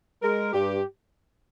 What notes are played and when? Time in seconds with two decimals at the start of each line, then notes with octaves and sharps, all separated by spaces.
0.22 G#3 A#4
0.53 G2 G4